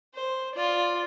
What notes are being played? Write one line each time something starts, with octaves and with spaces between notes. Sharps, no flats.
C5
F4 D5